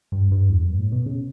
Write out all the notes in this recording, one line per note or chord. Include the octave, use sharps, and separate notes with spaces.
G2
G2
E2
F#2
G2
A2
B2
C#3